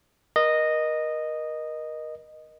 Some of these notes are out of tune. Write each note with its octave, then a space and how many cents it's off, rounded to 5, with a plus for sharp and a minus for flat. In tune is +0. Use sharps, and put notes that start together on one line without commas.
A#4 +30 D#5 -10